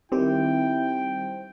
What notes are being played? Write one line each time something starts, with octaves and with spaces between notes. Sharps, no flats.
D#3 G3 C4 E4 G4 G5